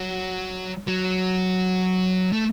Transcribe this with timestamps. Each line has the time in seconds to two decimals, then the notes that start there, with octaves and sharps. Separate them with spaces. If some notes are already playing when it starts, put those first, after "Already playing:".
Already playing: F#3
0.87 F#3
2.33 A3